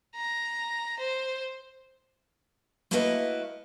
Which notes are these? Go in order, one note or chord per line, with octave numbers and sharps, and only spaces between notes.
A#5
C5
A3 A#3 E4 F#4 B4 D#5